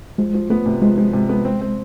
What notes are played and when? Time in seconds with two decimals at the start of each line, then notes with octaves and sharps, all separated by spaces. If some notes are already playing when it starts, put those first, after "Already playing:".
0.18 F3 G#3
0.34 F3
0.50 A3 B3
0.66 C3
0.82 F3 G#3
0.98 F3
1.13 C3
1.29 B3
1.45 C4
1.61 C4